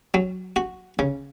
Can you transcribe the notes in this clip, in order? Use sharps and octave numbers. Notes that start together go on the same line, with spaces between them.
F#3
F#4
C#3